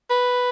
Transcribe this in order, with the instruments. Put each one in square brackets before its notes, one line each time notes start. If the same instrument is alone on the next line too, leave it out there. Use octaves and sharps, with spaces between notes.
[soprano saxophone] B4